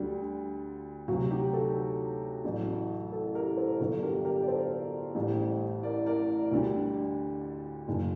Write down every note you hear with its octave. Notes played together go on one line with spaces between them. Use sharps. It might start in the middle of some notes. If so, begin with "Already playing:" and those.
Already playing: D2 D3 G3
D2 C3 F#3 F#4
D#4 G4
F#4 A4
A1 A2 F#3
F#4 A4
G4 A#4
A4 C5
G1 G2 D3 F#3 F#4 A4
G4 A#4
G4 A#4
D5
A4 C5
A1 A2 G3
A#4 D5
A#4 D5
D2 D3 G3
F#1 F#2 D#3